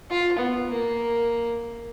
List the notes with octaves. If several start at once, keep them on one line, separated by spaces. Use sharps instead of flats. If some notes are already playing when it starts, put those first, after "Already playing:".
F4
B3
A#3